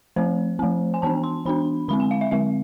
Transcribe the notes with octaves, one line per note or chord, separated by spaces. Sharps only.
F3 A3 C4 C5
F3 A3 C4
G#5
E3 B3 D4 A5
C6
E3 B3 D4 B5
D3 G#3 C4 B5
G#5
F5
E5
D3 G#3 C4 E5